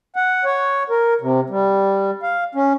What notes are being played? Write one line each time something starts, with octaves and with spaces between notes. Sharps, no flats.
F#5
C#5
A#4
C3
G3
F5
C#4